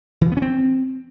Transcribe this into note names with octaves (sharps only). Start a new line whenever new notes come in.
E3
F3
B3
C#4
C4